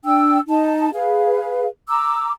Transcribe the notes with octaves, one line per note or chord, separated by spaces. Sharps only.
D4 G5 E6
D#4 A5
G#4 B4 F5
A#5 D6 E6